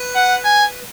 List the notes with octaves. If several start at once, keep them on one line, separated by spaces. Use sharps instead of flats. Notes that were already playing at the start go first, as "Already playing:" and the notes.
Already playing: B4
F#5
G#5